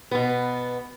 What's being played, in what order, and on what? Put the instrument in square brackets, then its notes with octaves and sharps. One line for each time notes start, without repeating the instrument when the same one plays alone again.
[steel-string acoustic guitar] B2 B3